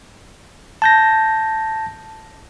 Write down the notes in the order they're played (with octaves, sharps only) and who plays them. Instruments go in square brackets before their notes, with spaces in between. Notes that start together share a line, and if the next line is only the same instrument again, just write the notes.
[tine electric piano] A5 G6 A#6